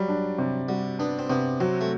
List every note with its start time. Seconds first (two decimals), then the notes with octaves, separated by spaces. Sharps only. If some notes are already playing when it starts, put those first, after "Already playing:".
Already playing: F#3 G3
0.09 D4
0.38 C3
0.68 G3 F#4
0.99 B3 D4
1.19 C4
1.29 C3 B3
1.60 F#3 C4
1.81 A3